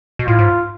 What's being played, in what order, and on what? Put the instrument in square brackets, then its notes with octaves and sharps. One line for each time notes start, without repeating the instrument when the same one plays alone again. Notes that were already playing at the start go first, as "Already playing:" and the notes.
[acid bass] B2
[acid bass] A2 [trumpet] F4
[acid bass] G#2